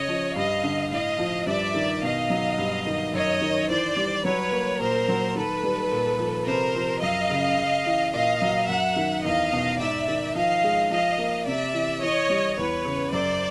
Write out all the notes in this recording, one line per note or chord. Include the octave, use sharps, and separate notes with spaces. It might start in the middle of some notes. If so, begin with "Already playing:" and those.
Already playing: C#3 C#5 D#5
F3
G2 D#5 F5
D3
A2 D#5 F5
F3
G2 D5 E5
D#3
B2 D#5 F5
F#3
G2
D#3
F#2 C#5 D#5
D#3
E3 C5 D5
G3
F#3 B4 C#5
A#3
A#2 A#4 C5
F#3
D#3 A4 B4
G3
A#2
F3
C3 A#4 C5
F3
F#2 D#5 F5
C#3
C#3
E3
A#2 D#5 F5
F#3
F#2 E5 F#5
D#3
E2 D#5 F5
B2
G#2 D5 E5
D#3
F3 D#5 F5
G#3
F3 D#5 F5
A#3
C3 D5 E5
E3
E3 C#5 D#5
G3
E2 B4 C#5
C#3
F#2 C5 D5